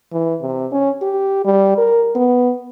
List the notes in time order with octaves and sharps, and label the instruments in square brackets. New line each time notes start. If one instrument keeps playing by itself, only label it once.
[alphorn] E3
C3
C#4
G4
G3
A#4
B3